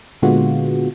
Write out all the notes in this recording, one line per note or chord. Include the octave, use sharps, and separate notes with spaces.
A#2 D3 G#3 B3 F4 F#4